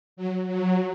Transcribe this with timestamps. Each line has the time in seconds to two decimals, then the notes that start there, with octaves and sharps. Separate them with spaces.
0.17 F#3
0.47 F#3